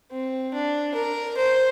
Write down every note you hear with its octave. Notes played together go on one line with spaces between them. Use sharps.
C4
D4
A#4
C5